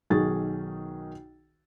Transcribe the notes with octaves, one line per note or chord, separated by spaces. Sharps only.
B1 D#3 F#4 G#4 A6